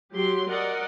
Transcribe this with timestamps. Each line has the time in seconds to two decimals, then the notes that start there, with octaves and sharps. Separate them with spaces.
0.13 F#3 G4 C6
0.50 A#4 D5 D#5 F#5